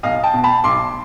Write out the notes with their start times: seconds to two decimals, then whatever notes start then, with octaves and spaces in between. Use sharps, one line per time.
0.03 B1 D#5 F5
0.23 G5 A5
0.33 B2
0.44 A5 B5
0.64 B1 C6 D6